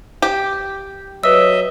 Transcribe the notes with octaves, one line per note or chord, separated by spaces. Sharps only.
G4
F#3 B4 C#5 D#5 E5 E6